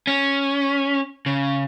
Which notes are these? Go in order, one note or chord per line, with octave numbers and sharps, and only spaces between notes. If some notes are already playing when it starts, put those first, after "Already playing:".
C#4
C#3